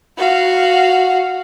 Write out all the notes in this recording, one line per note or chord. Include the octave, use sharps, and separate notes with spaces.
F#4 F5